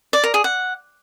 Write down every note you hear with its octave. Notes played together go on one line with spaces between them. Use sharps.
D5
A#4
G#4
F#5